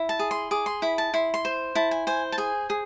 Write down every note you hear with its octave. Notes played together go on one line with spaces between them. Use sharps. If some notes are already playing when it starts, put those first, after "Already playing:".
Already playing: E4
A5
G#4
C6
G#4 D6
C6
E4 B5
A5
E4 C6
C6
C5
E4 A5
G#5
C5 G#5
A5
G#4 G#5
G#4